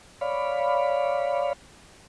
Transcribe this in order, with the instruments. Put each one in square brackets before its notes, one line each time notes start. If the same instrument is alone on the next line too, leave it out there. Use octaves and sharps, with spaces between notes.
[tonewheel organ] C#5 D5 F5 B5